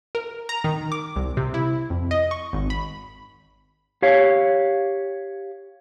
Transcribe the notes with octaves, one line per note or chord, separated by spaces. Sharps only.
A#4
A#5
D#3
D6
C2
C3
E4
F2
D#5
C#6
G#1
B5
G4 C#5 F5